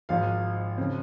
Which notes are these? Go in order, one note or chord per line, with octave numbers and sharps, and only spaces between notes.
G#1 G#2 F3 F5
C#3 F3 C4